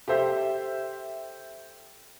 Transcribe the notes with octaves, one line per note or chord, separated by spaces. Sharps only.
G4 A4 C5 E5